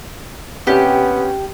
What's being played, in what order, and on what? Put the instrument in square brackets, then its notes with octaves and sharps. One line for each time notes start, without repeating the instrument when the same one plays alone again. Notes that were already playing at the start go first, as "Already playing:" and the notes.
[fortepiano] C3 C#4 [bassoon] B3 [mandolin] G4